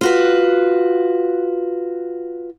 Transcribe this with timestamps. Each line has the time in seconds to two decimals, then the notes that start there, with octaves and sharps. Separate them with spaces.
0.01 F4 F#4 B4